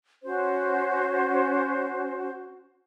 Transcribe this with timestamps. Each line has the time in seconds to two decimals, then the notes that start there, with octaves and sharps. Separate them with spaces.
0.23 C#4 F#4 C5